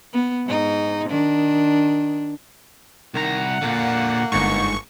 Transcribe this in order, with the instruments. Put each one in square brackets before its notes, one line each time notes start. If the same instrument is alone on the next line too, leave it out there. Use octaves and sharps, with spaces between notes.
[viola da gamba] B3
G#2 D#4
D#3 D4
[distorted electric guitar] C2 A#5 [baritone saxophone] D#3 [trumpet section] F#5
[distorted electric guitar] A#2 D3 [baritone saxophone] A#3
[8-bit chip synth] G1 C#6 [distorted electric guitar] G#2